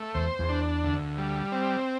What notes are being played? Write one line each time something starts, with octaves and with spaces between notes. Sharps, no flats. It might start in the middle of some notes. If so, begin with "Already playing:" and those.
Already playing: A3
E2 C5
E2
D4
D2
G3
C4